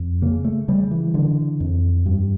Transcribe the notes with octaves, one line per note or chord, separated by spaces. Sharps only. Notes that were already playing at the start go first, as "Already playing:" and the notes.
Already playing: F2
C#3 A#3
A3
C#3 G3
E3
D3
F2
G2